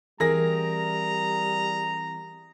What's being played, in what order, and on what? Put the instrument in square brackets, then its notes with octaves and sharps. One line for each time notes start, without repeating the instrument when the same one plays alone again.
[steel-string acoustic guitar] E3 C4 D5 [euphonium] G3 [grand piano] G#4 A#4 A#6 [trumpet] A#5